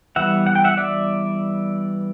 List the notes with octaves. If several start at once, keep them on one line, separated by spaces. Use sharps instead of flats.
E3 G3 B3 E5 F#5
F#5
G5
E5 F#5
D5 E5